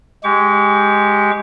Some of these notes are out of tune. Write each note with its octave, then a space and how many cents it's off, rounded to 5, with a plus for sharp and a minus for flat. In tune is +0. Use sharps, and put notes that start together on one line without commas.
G#3 +0 G4 +0 C#6 +40